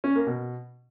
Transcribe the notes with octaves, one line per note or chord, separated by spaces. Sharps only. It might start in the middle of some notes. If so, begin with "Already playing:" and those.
C#4
A#3
B2